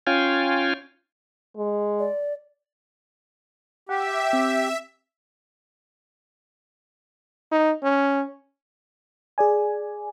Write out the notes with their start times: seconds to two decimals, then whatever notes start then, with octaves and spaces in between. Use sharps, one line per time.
0.07 C#4 F4 F5 G5 G#5
1.57 G#3
1.99 D5
3.89 G4 E5 F#5
4.33 C4
7.52 D#4
7.83 C#4
9.38 G#4 D5 G#5